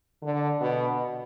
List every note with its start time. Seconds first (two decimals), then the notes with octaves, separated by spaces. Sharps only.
0.23 D3
0.60 B2